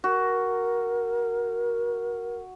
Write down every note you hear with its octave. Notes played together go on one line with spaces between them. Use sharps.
F#4 A#4